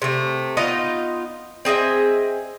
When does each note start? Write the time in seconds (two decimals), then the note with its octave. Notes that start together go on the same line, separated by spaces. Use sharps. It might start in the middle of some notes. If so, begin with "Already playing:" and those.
0.02 C3 A3
0.57 B3 D#4 F4 D#5
1.65 C4 G#4 D#5 E5